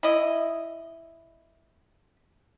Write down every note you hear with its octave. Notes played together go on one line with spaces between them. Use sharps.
E4 D#5